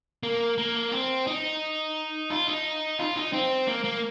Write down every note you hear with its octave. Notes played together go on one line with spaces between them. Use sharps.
A#3
A#3
C4
D#4
F4
D#4
F4
D#4
C4
A#3
A#3